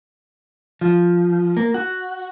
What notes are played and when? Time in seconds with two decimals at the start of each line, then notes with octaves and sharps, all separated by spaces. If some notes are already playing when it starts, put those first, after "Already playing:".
0.81 F3
1.57 A#3
1.74 F#4